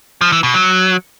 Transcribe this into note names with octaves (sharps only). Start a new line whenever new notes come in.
F3
E3
B2
F#3